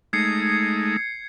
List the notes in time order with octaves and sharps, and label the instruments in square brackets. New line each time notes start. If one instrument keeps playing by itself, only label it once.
[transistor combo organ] G#3 A3 D#4 [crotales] G#6 C7 C#7